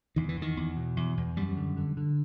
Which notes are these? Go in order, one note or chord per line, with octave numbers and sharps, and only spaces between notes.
E2 D#3
E3
E2 D#3
E2
B2
E2
E2
F#2 G3
D3
D3
D3